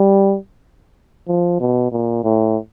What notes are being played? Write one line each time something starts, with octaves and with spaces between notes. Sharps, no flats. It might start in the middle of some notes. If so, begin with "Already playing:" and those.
Already playing: G3
F3
B2
A#2
A2